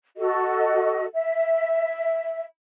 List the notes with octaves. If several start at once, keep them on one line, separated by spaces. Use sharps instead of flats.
F#4 A4 D#5
E5